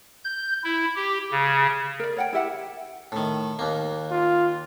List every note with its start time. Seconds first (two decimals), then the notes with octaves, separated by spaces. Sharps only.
0.24 G6
0.64 E4
0.96 G4
1.31 C#3
2.00 A#4 D5
2.17 C#5 F#5 G5
2.33 E4 G4 E5 F#5
3.12 A2 D#3
3.59 D#2 A#3
4.11 F4